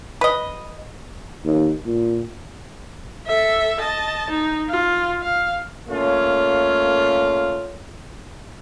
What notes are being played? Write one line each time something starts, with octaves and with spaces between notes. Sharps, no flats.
B4 D#5
D#2
A#2
A4 E5
D#5 A5
D#4
F4
F5
A3 A#3 C#4 F4